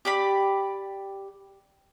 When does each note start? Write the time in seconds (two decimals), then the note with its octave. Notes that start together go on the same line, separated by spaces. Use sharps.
0.05 G4 D5 B5